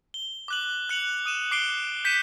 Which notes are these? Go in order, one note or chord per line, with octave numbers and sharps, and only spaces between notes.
G7
D6 F#6 F#7
F#6 C#7 F7 F#7
D#6 D#7 E7
D6 C7 D7 G7
G6 B6 C#7 D#7 E7